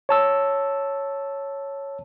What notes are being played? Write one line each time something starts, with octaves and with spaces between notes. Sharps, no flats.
C#5 A5 E6